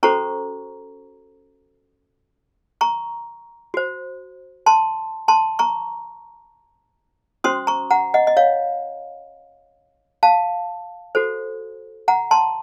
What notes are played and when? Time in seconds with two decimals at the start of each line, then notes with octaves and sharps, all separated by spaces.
0.03 C#4 F#4 A4 C5 A#5 C#6
2.81 A#5 C#6
3.74 F#4 C5
4.66 A5 C6
5.28 A5 C6
5.59 A#5 C#6
7.44 C#4 F#4 C5 C6 D#6
7.67 A#5 C#6
7.91 F#5 A#5
8.14 D#5 F#5
8.27 D#5
8.37 C#5 F5
10.23 F5 A5
11.15 F#4 A4 C5
12.08 F#5 A#5
12.31 A5 C6